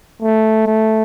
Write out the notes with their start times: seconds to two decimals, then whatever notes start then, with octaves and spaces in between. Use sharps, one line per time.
0.22 A3
0.67 A3